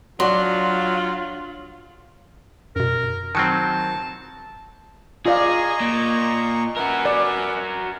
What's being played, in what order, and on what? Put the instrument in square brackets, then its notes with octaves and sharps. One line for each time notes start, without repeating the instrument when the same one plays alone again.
[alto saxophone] F#3 [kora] D4 F#4 D#5 [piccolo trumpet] F4 [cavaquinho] C6
[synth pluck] F#2 B2 [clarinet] A#4
[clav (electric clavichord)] D#3 F#3 C4 [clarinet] A5 [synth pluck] E6 F6 C#7
[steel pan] F4 D5 F5 [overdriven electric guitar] G#4 [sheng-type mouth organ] D#5 A#5 C#6
[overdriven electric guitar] A#2
[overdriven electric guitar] F#4 A#4 [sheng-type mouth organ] B4 E5 G#5
[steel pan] D5